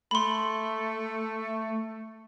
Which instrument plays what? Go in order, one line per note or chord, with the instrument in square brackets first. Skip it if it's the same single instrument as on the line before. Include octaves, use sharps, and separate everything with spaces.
[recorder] A3 [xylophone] B5 C6